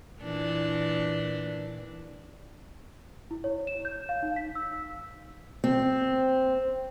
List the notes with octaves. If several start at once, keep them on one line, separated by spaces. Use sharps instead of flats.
A#2 E3 D4
E4
C#5
E7
G6
F5
D#4
B6
E6
C4